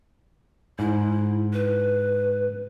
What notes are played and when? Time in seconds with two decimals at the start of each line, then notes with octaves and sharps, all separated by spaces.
0.79 G#2 E4
1.53 B4